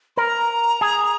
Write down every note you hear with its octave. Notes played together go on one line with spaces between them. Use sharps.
A#4 A#5 C6
G#4